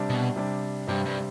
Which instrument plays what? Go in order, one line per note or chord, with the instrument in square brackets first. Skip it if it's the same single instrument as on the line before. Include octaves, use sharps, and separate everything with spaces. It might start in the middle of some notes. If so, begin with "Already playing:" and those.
Already playing: [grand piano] C3 G3 D4
[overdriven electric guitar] B2
[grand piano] C3 G3 D4
[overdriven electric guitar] G2 [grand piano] C3 G3 D4
[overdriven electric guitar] G2